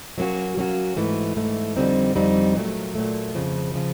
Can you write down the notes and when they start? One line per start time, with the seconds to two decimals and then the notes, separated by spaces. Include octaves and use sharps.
0.18 F#3 A#3 C#4 F#4
0.57 F#3 A#3 C#4 F#4
0.97 G#2 E3 A3
1.36 G#2 E3 A3
1.76 F2 D3 G3 C4 D#4
2.15 F2 D3 G3 C4 D#4
2.55 A#2 F#3 A3
2.95 A#2 F#3 A3
3.35 F2 C#3 F3
3.74 C#3 F3